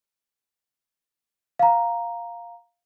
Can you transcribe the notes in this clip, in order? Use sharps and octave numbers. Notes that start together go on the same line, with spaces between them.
F5 A#5